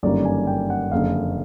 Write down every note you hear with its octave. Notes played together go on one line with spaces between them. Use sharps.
G1 F#2 D#3 G3 A#3 D5
G#5
G5
F#5
F#1 F2 D3 F5